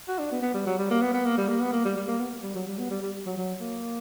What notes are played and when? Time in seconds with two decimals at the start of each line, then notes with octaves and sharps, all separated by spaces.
0.08 F#4
0.19 D4
0.32 B3
0.42 B3
0.54 G3
0.66 F#3
0.78 G3
0.91 A#3
1.01 B3
1.14 B3
1.25 A#3
1.37 G3
1.48 A#3
1.60 B3
1.73 A#3
1.85 G3
1.96 G3
2.08 A#3
2.20 B3
2.43 G3
2.55 F#3
2.67 G3
2.78 B3
2.90 G3
3.02 G3
3.26 F#3
3.37 F#3
3.60 A#3